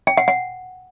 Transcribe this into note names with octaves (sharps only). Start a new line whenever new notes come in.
G5
F#5
F#5